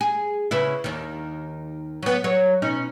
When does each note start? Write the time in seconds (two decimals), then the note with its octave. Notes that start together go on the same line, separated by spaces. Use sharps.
0.01 G#4
0.51 C#3 B3 E4
0.84 D#2 D#3
2.03 F#3 B3
2.24 F#3 C#5
2.62 B2 C#4 D#4